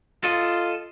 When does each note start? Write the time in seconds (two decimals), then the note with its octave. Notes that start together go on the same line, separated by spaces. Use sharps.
0.24 F4 A4 D#5